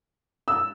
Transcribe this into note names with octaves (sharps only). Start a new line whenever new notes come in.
E6